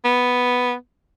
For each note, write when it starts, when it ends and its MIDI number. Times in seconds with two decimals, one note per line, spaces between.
0.05 0.73 59